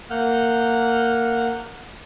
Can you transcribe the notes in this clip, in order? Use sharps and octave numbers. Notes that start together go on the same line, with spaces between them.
A#3 F#5 F6 G6